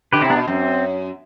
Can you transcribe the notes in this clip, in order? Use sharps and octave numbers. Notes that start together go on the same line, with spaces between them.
D3 G4 B4
C3 C4 E4
B3 D4
B2
F#2 C4